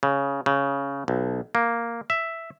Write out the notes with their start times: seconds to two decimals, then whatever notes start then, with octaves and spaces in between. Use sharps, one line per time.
0.03 C#3
0.46 C#3
1.08 B1
1.55 A#3
2.10 E5